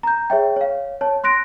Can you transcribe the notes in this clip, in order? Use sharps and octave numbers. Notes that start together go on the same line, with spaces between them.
A#5 G6
G#4 C#5 E5 G5
C#5 F5
C#5 A5
C6 F#6 A#6 D7